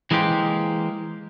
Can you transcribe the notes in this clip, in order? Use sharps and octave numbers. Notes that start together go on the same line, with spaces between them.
E3 G#3 A#3 G4 C5